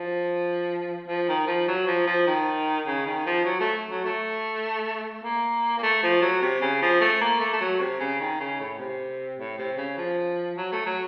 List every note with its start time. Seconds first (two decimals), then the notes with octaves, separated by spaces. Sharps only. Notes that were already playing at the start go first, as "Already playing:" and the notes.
Already playing: F3
1.07 F3
1.28 D#3
1.47 F3
1.68 F#3
1.87 F3
2.07 F3
2.27 D#3
2.87 C#3
3.06 D#3
3.26 F3
3.45 F#3
3.60 A3
3.90 F#3
4.05 A3
5.24 A#3
5.78 A#3
5.83 A3
6.03 F3
6.21 F#3
6.42 C3
6.61 C#3
6.82 F3
7.01 A3
7.21 A#3
7.40 A3
7.53 A3
7.61 F#3
7.80 C3
7.99 C#3
8.20 D#3
8.40 C#3
8.60 A2
8.78 C3
9.38 A2
9.58 C3
9.77 C#3
9.98 F3
10.57 F#3
10.72 A3
10.86 F#3